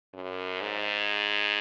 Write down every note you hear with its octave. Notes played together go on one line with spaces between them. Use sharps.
F#2
G#2